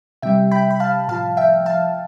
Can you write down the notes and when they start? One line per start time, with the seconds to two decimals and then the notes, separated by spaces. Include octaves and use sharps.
0.22 C3 G3 E5 G5
0.51 G5 B5
0.71 B5
0.80 F5 A5
1.08 A2 F3 F5 A5
1.37 E5 G5
1.66 F5 A5